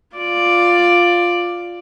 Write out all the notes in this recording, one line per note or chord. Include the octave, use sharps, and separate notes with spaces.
F4 D5